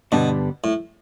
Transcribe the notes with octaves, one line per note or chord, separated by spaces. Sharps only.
G2 B2 D3 G3 B3 D4
A2